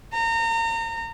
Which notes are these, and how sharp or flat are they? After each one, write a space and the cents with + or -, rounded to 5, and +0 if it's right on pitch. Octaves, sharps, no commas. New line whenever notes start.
A#5 -30